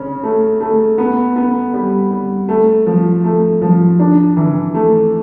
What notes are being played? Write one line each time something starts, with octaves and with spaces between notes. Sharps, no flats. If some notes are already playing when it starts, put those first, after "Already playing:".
Already playing: C#3 C#4
A3
A3
B3
B3
G3
G3
A3
F3
A3
F3
D4
E3
A3